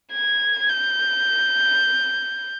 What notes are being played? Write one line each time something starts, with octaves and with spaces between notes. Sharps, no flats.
G#6
G6